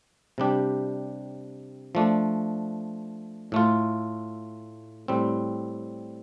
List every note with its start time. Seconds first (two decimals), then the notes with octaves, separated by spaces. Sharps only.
0.38 C3 G3 D4 G4
1.95 F3 A3 D4
3.52 A2 A3 F4
5.08 A2 G3 C4